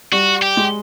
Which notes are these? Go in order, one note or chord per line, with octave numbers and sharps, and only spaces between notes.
G3 F#4
G4
G#3